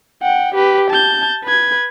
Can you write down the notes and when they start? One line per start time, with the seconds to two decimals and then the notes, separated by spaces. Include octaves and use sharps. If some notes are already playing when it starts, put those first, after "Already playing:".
0.22 F#5 G5
0.55 G4 B4
0.91 A5 G6
1.45 B4 G#6